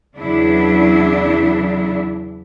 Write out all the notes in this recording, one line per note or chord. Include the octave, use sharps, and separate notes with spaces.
E2 C#3 F#3 D4 E4